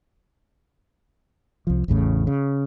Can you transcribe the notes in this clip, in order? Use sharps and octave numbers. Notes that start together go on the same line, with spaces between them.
C2 F3
A1 E2 A2 C#3
C#3